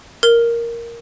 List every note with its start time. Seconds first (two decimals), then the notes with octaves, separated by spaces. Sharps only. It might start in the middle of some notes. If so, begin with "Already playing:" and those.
0.23 A#4